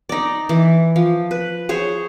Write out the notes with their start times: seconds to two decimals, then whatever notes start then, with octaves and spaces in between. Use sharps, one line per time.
0.09 D#4 D5
0.49 E3
0.96 F3
1.31 B4
1.69 G#4 C5 C#5